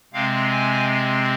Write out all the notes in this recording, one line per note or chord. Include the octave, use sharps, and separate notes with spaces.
C3 G#3 C4 F5
G#5